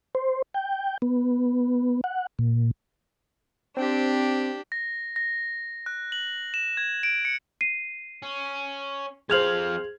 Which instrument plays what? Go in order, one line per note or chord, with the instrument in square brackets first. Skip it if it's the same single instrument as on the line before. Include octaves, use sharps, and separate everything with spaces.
[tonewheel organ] C5
G5
B3
F#5
A#2
[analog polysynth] C4 [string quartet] D4 G4
[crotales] A#6
A#6
F#6
F#7
E7
G#6
D7
C#7
[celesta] C7 D#7
[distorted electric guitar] C#4
[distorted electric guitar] F2 F5 [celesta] G#4 F7 F#7 [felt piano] C5 F6 G#6